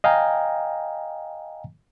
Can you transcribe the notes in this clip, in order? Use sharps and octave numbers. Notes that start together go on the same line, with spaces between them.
D#5 F5 G5 G#5 A#5